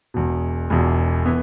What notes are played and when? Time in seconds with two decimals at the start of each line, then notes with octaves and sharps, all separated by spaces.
0.14 E1 E2 B2
0.70 E1 E2 B2
1.26 E3 B3